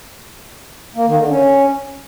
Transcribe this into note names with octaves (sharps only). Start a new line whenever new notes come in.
A#3
D#3
D3
C#4